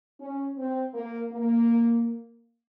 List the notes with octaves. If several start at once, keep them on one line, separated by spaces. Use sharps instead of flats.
C#4
C4
A#3
A#3